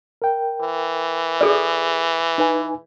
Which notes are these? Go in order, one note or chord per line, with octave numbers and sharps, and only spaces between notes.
A#4 G5
E3
G#4 A4 D5
D#4 B4 G#5